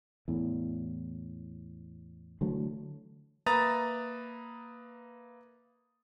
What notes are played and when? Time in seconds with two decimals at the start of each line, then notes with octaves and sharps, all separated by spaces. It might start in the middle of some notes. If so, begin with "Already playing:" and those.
0.28 E2 A2
2.41 D3 E3 F#3 A3
3.46 A#3 B4 E5 A#5 D#6 A6